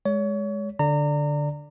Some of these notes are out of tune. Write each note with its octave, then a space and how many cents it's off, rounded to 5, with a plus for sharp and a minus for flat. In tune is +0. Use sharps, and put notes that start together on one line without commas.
G#3 +0 C#5 +35
D3 +0 D5 +0 A#5 -30